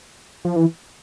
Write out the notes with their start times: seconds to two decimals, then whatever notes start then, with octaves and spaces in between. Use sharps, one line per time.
0.45 F3
0.56 E3